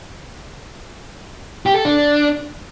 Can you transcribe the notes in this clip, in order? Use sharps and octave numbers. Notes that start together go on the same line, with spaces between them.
G4
A4
D4